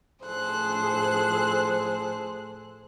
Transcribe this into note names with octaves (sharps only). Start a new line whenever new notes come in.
A2 F3 G#4 A4 C5 F#6